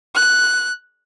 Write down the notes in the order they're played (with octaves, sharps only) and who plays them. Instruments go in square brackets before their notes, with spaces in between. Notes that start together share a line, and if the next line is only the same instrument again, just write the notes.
[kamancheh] F#6